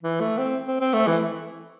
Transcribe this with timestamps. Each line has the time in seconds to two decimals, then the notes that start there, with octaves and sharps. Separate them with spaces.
0.03 E3
0.20 A3
0.38 C4
0.68 C4
0.81 C4
0.93 A3
1.07 E3